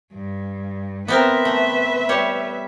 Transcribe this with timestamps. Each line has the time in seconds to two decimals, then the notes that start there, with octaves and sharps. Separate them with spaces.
0.14 G2
1.08 B3 C4 A#4 B4 E5
1.45 A3
2.09 G3 C#5